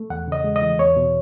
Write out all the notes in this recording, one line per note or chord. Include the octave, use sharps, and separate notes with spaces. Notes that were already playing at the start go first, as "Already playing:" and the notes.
Already playing: A3
E2 F#5
C#3 D#5
G#3
D#5
E3
E2 C#5
B2